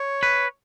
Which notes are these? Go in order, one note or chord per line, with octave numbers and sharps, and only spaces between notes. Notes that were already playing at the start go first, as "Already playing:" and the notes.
Already playing: C#5
B4